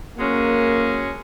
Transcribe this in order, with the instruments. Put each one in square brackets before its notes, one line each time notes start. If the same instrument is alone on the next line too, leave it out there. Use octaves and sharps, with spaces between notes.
[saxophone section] F#3 G#3 C#4 [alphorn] A#3